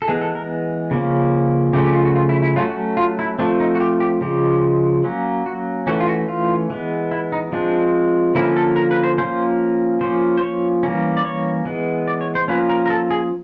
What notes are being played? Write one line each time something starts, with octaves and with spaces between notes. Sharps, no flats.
A4
E3 G#3 B3 G#4
A4
A#4
C#3 F3 A#3 C#4
C#3 F3 A3 C#4 G4
G4
F4
F#4
F4
E4
E4
F#3 A3 C#4 F4
F#4
F4
E4
F3 A3 C4 D4
D#4
F#4
G4
G4
C#3 F3 G#3 G4
F#3 A#3 C#4
F#4
E3 A3 C#4 F#4
F4
F#4
F4
E3 G#3 B3
E4
D#4
F3 G#3 C4 D4
D3 F3 A#3 C#4 E4
A4
A#4
B4
C5
F3 A#3 C#4 C5
F3 A#3 C#4 C5
C5
C#5
E3 G3 A#3 C#4
D5
C#5
E3 G#3 B3
D5
C#5
C5
F3 A#3 C#4 B4
A#4
A#4
A4
G#4